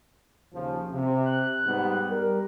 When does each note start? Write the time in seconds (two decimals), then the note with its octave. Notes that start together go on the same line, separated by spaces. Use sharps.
0.54 D#2 C#3 F3
0.91 C3
1.26 F#6
1.66 G#2 G3 B3
2.10 G3 A#4